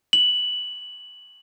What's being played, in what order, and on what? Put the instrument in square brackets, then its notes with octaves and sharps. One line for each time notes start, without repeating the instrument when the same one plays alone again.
[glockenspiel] F#7